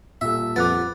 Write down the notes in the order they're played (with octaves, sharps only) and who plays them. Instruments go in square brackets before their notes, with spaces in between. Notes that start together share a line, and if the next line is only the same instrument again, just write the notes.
[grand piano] A#2 G3 A4 [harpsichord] E5
[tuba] F2 [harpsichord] B3 [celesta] D6 F#6 A6